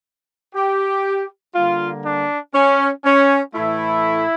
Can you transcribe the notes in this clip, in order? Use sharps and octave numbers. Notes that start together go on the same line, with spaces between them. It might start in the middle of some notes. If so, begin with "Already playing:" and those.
G4
D3 G3 A#3 F4
D4
C#4
C#4
A2 E3 A3 E4